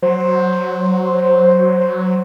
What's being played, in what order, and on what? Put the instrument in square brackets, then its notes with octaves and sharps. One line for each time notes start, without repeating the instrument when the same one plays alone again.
[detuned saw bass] F#3 [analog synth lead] C5